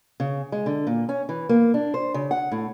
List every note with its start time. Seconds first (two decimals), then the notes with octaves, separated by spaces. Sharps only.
0.20 C#3
0.52 G#3
0.66 D3
0.87 A#2
1.09 C#4
1.29 E3
1.49 A#3
1.74 D4
1.94 C5
2.14 C#3
2.31 F#5
2.52 A2